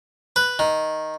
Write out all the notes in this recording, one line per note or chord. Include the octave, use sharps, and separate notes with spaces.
B4
D#3